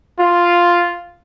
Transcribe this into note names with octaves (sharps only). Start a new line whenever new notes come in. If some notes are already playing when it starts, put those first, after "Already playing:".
F4